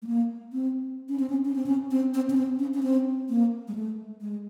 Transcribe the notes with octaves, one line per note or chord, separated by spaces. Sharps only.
A3
A#3
C4
C#4
C4
C#4
C#4
C4
C#4
C4
C4
C#4
C4
C#4
C#4
C4
A#3
G#3
A3
G#3